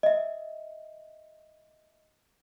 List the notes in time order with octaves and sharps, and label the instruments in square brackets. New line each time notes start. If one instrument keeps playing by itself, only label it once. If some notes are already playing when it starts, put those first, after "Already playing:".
[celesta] D#5 E5